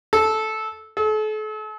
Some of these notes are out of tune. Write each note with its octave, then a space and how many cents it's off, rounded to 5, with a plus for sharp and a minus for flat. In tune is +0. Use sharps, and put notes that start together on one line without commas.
A4 -10
A4 -40